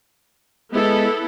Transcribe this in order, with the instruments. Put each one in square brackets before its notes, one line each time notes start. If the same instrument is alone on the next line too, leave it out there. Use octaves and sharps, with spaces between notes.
[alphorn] G#3 [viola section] B3 E4 A4